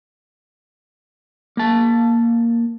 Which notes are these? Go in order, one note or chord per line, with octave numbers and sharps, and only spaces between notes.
A#3 A5